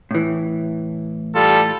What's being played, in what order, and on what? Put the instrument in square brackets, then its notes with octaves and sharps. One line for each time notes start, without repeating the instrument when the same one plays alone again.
[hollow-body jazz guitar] A2 E3
[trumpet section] G3 F4 A4